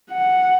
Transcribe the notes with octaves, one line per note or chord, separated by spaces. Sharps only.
F#5